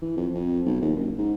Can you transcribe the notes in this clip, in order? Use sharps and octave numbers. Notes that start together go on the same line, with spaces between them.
E3
F2
F2
B1
D#2
F#1
G#2